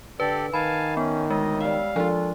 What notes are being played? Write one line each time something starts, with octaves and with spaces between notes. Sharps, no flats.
D3 G4 A4 B4 D5
D#3 F5 G#5 A5 B5
B3 C#4
D2 G#3 D#5
G3 E5 F5
F3 D4 F4 A4